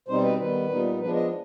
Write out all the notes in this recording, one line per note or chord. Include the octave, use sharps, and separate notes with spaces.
B2 G3 C4 D#4 C5
B4
D#3 G3 B3 B4
A#2 G3 B3 D#4
F3 G#3 B3 D4 B4
D#5